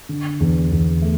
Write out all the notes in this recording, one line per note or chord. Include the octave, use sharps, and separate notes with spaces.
D3
E2
E2
A3